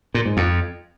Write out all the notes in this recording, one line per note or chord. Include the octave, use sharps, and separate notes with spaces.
A#2
G#2
F2